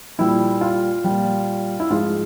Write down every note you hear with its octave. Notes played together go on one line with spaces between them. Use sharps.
A#2 G3 E4
F4
A#2 G3
E4
G#2 F3 G#3 F4